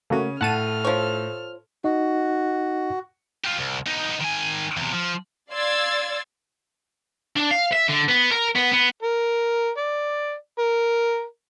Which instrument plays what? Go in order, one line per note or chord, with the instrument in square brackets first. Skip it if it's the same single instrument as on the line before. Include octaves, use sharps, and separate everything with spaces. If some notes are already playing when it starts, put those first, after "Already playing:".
[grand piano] C#3 C#4 [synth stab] A3 A#3 F#4
[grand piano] A2 [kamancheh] A4 F6 [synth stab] F#5 A5 D#7
[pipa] F3 C#5
[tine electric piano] D#4 D#5 [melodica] F#4
[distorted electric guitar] F4 G4
C2
B3 D#4
D#3 G#5
E2 C3
F3
[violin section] D5 F5 C6 E6 G#6 A6
[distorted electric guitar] D4
F5
E5
D3
B3
A#4
B3
B3
[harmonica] A#4
D5
A#4